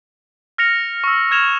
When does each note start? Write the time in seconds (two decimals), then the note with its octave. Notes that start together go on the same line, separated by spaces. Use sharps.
0.58 F6 A#6 C#7 F7
1.04 C#6 E6
1.31 F6 G#6 E7 F7